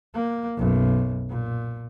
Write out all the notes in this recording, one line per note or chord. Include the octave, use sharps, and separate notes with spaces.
A#3
B1 F#2
A#2